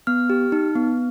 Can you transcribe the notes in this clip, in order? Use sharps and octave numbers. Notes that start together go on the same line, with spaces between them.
B3 F6
G4
D#4
B3